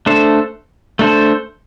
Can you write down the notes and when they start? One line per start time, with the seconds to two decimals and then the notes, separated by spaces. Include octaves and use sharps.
0.06 A3 D4 A4 C5
0.99 A3 D4 A4 C5